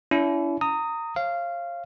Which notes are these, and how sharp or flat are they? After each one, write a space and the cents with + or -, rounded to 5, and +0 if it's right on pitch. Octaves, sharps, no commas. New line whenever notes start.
C#4 +45 E4 +15
A#5 -25 D#6 +5
C#5 -40 F5 -15